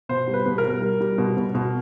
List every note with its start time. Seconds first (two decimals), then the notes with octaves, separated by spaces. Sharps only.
0.09 B2 C5
0.27 G3
0.34 B4
0.46 B2
0.58 A#4
0.64 G3
0.82 G3
1.01 G3
1.18 B2
1.37 B2
1.54 B2